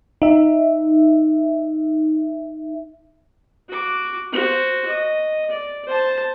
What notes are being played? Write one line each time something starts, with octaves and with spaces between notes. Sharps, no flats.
D#4 E5
F#4 D6
F#4 C5
D#5
D5
C5 A5